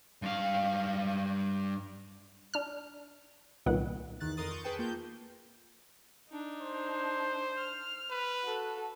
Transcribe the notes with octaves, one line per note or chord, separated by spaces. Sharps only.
G2 F5
D4 F6
C2 A#2 D#3 B3 F#5
E2 D#3 F#6 A6
F2 A#4 C6 D#6 A6
C#6 G6
G#4 B4 G5 A5 C#6
A#3 F4 G6
D4 D#4
C5
F6
B4
F#4 A4